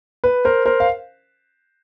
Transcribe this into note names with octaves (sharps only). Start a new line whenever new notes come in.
B4
A#4 C5
A#4 C5
F5